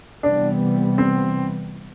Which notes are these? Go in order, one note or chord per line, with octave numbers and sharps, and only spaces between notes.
C3 E3 G3 B3 D4
C4